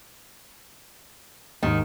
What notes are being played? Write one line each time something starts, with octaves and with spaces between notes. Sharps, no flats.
D#2 G#2 D#3